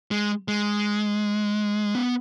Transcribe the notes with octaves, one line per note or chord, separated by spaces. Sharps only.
G#3
G#3
B3